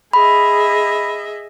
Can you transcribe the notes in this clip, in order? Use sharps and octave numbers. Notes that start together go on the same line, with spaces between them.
G#4 D#5 E5 B5